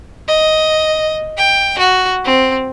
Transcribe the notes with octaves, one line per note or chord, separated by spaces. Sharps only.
D#5
G5
F#4
C4